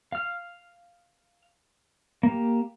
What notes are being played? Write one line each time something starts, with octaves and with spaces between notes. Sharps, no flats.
F5 F6
A#3 G4